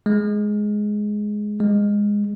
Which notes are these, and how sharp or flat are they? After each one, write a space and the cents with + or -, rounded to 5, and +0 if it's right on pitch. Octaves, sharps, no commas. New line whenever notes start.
G#3 +5
G#3 -15